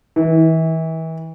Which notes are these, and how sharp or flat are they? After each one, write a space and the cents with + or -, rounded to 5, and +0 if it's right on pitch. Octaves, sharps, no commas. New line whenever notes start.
E3 -35